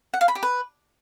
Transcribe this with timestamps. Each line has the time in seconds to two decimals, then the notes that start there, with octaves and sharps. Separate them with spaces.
0.14 F#5
0.21 F5
0.28 B5
0.35 G4
0.43 B4